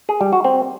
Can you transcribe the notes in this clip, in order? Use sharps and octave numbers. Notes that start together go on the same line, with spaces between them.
G#4
G3
F#4
C4